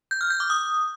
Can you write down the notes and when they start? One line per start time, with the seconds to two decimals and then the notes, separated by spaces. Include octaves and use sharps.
0.11 G6
0.21 F6
0.30 G6
0.40 D6
0.50 D#6